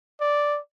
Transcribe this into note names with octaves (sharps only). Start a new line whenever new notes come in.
D5